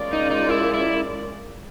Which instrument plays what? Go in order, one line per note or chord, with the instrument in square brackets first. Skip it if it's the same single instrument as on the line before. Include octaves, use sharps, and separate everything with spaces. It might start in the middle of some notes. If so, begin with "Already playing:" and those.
Already playing: [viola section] G#3 C#4 F4 A#4 D5
[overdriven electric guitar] D#4
D#4
E4
E4